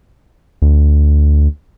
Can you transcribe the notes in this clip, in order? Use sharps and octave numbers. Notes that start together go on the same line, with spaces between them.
D2